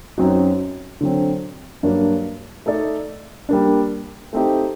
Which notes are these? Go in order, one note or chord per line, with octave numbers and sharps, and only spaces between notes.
F#2 F#3 C4 D#4 F#4
D3 F#3 C4
G2 F#3 A#3 D4
A3 D#4 A4 D5
G3 A#3 D4
A3 C4 D#4 G4